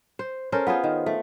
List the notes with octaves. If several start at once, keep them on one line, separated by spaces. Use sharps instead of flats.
C5
C#4 A4 A#4 C5
B3 F4 G#4 C5
D#3
A3